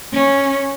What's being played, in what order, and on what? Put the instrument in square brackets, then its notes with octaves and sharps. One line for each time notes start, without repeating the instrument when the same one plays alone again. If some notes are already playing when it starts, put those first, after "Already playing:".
[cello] C#4